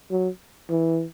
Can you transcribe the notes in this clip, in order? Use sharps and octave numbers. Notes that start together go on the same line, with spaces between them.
F#3
E3